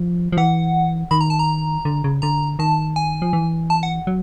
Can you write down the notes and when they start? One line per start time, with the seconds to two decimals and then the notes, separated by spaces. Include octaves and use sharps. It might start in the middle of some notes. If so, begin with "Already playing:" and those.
Already playing: F3
0.32 F3
0.37 E3 F#5
1.11 D#3 B5
1.21 A#5
1.30 A5
1.39 A#5
1.85 D3
2.04 C#3
2.22 D3 A#5
2.59 D#3 A5
2.96 G#5
3.22 F3
3.33 E3
3.70 A5
3.83 F#5
4.07 F#3